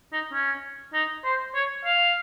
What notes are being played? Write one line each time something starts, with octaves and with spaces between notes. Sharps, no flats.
D#4
C#4
D#4
C5
C#5
F5